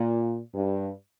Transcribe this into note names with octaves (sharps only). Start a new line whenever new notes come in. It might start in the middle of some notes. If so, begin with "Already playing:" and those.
Already playing: A#2
G2